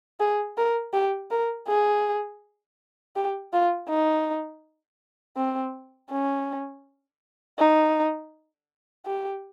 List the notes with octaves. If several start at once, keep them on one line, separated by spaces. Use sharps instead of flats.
G#4
A#4
G4
A#4
G#4
G4
F4
D#4
C4
C#4
D#4
G4